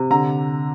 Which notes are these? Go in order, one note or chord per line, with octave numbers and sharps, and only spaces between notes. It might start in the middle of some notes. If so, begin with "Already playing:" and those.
Already playing: C3
D3 A#5